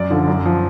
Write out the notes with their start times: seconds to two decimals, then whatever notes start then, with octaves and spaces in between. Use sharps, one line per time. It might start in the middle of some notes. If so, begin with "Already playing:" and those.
Already playing: F#2 D5
0.11 D3 F3
0.28 F#2
0.45 F3